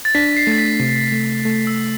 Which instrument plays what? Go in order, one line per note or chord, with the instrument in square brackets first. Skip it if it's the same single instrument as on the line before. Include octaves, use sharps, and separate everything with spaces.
[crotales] A6
[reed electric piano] D4 [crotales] B6
[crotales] B6
C7
[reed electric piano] A3 [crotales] A6
[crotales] B6
[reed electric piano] C3
A3
A3
[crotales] E6